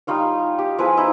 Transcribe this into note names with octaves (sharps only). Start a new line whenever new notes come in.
G3 D#4 F4 C#5
G4
F3 E4 G#4 B4
D#4 E4 D#5